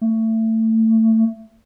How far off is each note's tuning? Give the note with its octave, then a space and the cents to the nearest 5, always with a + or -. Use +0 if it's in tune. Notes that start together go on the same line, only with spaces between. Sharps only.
A3 +25